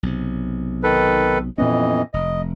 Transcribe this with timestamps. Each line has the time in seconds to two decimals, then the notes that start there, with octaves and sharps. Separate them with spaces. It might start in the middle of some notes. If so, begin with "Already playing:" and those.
0.03 B1 C3
0.83 D#3 A4 B4
1.58 F2 A#2 E3 B3 C#4 D#5
2.14 F1 D#5